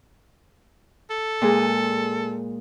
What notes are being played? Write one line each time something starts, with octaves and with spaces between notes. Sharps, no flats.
A4
A#2 G#3 G#4